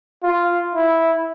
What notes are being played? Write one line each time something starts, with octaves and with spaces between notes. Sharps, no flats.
F4
E4